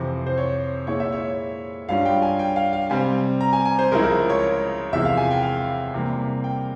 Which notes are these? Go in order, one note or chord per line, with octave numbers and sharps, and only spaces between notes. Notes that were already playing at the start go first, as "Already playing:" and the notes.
Already playing: F2 C3 E3 C5
C5
C#5
A#2 G#3 E4 C#5
E5
C#5
G2 G3 C#4 F4 F5
G5
G#5
G5
F5
F5
C3 G3 C4 G#5
A#5
G#5
G#5
C5
C#2 C#3 F3 G#3 E4 A#4
A#4
C#5
E2 C3 F3 G#3 E4 E5
F5
G#5
G5
F5
C3 E3 G3 A#3
G5